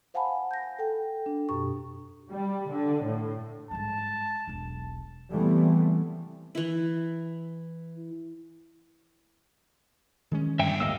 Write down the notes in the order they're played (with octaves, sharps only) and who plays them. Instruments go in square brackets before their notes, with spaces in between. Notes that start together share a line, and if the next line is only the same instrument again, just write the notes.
[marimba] C5 F5 F#5 G#5 A5 B5
G6 A#6
A4 G5
D4
F#2 B2 G4 C#6
[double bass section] G3
D3
A2
[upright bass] G#2 G3 [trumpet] A5
[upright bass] E1 B1
[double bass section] C#3 E3 G3 A3 B3 C4
[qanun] E3 E4
[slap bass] D#3 G#3 C#4
[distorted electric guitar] G2 D3 [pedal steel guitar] E5 G5
[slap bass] D1 A#3 [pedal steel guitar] D#5 F5 E6